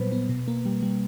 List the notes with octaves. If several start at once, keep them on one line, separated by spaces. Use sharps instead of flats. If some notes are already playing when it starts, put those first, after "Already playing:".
Already playing: A#2 F#3 G3 B3 B4 C5
B3
B2
A#3
G3
G3